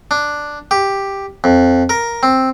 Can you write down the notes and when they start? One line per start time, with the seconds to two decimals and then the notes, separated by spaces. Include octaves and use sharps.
0.11 D4
0.71 G4
1.44 F2
1.89 A#4
2.23 C4